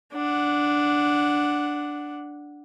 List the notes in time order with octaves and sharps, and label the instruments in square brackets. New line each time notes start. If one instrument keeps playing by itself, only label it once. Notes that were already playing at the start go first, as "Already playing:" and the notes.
[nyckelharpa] D4 F#5